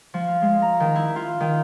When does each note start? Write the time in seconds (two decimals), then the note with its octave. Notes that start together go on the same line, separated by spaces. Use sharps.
0.14 F3
0.28 F4
0.42 G#3
0.62 A#5
0.80 D#3
0.96 E4
1.16 F4
1.40 D#3